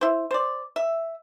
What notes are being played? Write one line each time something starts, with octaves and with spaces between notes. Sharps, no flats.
E4 C5
C5 D5
E5